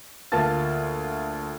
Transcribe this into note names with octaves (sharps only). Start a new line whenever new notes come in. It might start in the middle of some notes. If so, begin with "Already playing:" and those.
D2 A#3 F4 A5 A6